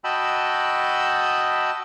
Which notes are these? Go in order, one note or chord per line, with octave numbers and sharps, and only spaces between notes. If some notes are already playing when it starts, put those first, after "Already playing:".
F#4 D#5 G5 A5 B5 E6